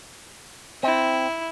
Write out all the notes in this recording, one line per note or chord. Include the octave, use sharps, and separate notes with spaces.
C4 E4